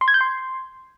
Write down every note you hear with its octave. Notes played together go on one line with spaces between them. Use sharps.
C6
G#6
G6
C6